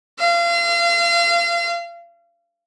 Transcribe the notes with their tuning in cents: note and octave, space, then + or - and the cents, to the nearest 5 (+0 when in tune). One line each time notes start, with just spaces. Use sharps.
F5 -35